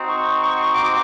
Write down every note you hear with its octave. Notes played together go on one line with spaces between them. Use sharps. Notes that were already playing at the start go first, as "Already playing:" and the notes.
Already playing: C4 D#4 F#4
C#6
C#6
D6